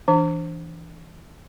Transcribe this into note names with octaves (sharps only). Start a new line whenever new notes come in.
E3 D4